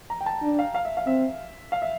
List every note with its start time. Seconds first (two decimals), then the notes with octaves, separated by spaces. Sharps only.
0.10 A#5
0.21 G5
0.26 A5
0.42 D4
0.59 F5
0.75 F5
0.85 E5
0.97 F5
1.07 C4 E5
1.72 F5
1.82 E5